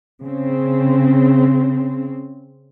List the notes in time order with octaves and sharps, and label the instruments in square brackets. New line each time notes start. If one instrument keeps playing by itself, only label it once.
[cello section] C#3 C4